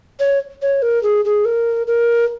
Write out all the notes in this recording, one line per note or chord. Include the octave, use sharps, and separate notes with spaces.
C#5
C#5
A#4
G#4
G#4
A#4
A#4